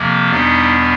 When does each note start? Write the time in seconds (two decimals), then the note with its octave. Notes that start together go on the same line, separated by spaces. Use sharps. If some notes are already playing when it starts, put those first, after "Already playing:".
Already playing: F2 C3 F3 A#3
0.31 E2 B2 G3 B3 D4 D#4